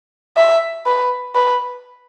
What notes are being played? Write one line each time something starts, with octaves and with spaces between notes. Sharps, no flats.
E5
B4
B4